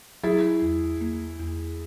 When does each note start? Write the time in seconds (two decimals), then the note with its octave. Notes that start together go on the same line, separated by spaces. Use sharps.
0.23 F#3 E4 G#4
0.62 E2
1.01 A#3
1.39 E2